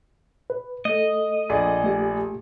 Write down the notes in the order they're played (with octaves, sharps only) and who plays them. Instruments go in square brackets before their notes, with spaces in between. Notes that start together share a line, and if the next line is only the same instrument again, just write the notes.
[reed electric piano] B4
[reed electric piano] A3 A4 [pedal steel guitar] D#5
[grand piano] A#1 G#4 D5
[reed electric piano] A3 G4